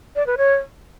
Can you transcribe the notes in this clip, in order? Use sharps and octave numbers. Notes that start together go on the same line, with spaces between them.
D5
B4
C#5